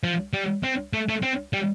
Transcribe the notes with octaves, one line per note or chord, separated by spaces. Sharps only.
F3
G3
C4
A3
A3
C4
G3